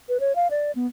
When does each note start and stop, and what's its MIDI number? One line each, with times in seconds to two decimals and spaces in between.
0.09 0.18 71
0.20 0.35 73
0.35 0.48 77
0.51 0.72 74
0.75 0.87 59